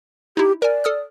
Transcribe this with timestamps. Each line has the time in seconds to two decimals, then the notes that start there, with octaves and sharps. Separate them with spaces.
0.37 D#4 E4 G4
0.62 A#4 D5 G#5
0.84 A4 D#6 F6